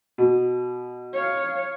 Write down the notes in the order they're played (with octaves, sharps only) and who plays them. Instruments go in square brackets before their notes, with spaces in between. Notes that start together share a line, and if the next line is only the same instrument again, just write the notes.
[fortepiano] B2
[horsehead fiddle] C#5 F5